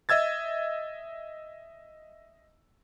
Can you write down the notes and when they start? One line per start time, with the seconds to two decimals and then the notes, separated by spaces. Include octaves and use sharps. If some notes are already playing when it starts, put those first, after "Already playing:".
0.09 D#5 E5 E6 G#6 A6